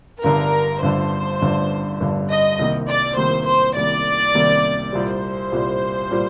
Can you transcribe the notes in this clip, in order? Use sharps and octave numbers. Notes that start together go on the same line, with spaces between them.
G1 G2 D3 A#4
G1 G2 D3 C5
G1 G2 D3
G1 G2 D3
D#5
C2 C3 D#3 A#3
D5
C2 C3 D#3 A#3 C5
C5
C2 C3 D#3 A#3 D5
C2 C3 D#3 A#3
C2 A#2 G3 C5
C2 A#2 G3
A#2 G3